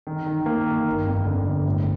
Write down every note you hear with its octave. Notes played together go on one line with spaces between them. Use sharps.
D#3
D#3
A#3
D#3
G1
F2
D3
G1
A2